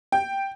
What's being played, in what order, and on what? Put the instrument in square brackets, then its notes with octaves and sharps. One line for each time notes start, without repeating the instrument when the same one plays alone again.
[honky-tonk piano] G5